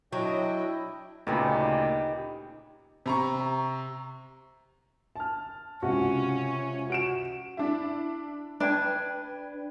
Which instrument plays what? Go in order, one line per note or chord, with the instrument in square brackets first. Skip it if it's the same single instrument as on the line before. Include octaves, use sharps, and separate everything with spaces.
[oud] F#3 [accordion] D4 D#5 G5 [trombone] E4
[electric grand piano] D2 A#2 C#3 [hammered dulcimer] D#4 G4 B4
[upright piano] C3 A#5 C#6
A5 F6
[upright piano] C#2 C3 [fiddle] C#4 [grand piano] F#4
[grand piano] F#4 D7 E7
[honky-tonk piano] D4 E4
[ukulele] D4 [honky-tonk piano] B4 G5 G#6